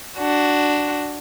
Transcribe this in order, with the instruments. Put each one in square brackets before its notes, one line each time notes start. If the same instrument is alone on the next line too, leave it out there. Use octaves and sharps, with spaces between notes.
[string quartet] D4 F#4